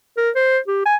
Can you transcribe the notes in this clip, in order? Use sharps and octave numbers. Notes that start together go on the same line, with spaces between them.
A#4
C5
G4
G#5